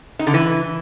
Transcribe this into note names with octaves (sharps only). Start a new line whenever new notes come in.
D#4
D3
E3